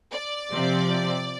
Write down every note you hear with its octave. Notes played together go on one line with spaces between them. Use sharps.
D5
C3 F3 C4